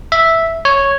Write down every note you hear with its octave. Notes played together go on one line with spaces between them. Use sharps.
E5
C#5